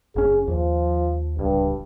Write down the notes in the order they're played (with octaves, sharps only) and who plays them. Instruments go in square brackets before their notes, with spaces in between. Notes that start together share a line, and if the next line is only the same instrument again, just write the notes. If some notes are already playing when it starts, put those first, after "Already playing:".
[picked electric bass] F#1 C#4 [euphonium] G#4
[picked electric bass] D#2 [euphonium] F3
[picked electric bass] D1 C#2 [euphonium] G2